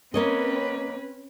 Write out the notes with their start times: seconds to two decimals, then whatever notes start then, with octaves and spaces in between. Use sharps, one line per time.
0.14 A#3 C4 C#4 B4 C#5 D#5